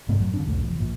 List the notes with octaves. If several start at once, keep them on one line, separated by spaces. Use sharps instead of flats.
G2 C3 A3 C4
A1 F#2 F#3
D3 C4 D4
B1 E2 G3 A3
F1 F2 E3
A#1 A#2